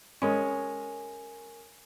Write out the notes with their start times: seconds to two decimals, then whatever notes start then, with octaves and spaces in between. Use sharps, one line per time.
0.22 G#3 C#4 A#4 G#5